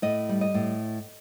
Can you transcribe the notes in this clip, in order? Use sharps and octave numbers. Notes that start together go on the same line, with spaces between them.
A2 D#5
G3
D#5
A2